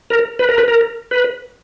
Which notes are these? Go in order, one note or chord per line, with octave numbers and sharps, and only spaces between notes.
A#4
B4
A#4
B4
A#4
B4